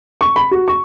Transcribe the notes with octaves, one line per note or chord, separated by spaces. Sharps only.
C#6
B5
F#4
C#6